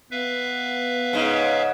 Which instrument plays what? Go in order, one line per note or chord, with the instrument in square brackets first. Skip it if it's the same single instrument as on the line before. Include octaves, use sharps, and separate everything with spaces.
[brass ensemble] B3 [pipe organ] B4 E5 F5
[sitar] G#2 C#3